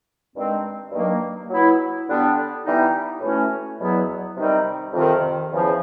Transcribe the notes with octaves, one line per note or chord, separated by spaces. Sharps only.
G2 D#3 G#3 C4
G2 D#3 F#3 A#3
F#3 B3 E4
D3 G3 B3 D4
E3 G3 B3 D#4
A2 E3 A3 C#4 F#4
E2 B2 F#3 B3 E4
C3 D#3 G3 C4 D#4
F2 C3 D#3
E2 C#3 F3